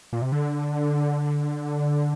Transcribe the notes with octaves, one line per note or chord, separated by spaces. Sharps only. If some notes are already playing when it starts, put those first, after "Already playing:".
A#2
C3
D3